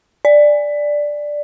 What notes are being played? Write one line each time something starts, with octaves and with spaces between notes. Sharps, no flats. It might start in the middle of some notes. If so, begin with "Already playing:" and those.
D5